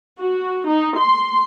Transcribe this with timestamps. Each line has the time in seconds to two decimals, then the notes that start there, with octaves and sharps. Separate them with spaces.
0.19 F#4
0.68 D#4
0.98 C6